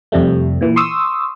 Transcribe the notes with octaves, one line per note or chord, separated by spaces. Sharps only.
F2 C3 G3 A3
A#2 E3
C6 C#6 D#6 E6